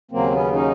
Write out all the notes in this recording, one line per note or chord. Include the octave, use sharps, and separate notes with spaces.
D#2 C#3 F#3 A#3 C4
B3 C#4
C#4 D#4